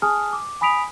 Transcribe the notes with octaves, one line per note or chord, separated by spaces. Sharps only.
G#4 G#5 A5 D#6 F6
D6
G#5 B5 D#6 B6 D7 F7